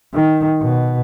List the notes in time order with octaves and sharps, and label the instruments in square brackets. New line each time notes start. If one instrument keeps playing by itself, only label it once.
[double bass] D#3
B2